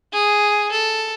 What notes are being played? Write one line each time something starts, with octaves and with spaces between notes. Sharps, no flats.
G#4
A4